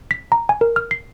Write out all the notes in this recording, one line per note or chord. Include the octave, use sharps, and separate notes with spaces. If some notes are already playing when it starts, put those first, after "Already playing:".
B6
A#5
G#5
A#4
F6
C7